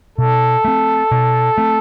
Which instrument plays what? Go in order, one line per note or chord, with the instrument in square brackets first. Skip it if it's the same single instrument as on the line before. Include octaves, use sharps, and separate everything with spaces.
[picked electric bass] B2 [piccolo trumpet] A4
[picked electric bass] A3 C4
B2
A3 C4